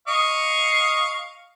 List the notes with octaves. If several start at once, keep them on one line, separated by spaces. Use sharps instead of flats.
D#5 F5 C#6